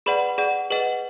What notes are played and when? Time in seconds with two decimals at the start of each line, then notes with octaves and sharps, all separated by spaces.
0.06 G#4 B4 D5 F#5 B5
0.38 G#4 D5 F#5
0.70 G#4 B4 D#5 F#5